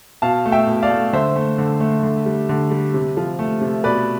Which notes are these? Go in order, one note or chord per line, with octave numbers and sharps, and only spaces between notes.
B2 F5 A5
A3
E5 G5
B2
D5 F5
A3
D3 C5 E5
A3
D3
A3
D3
G3
D3
G3
C3
F3
A3
C3
B2 B4 D5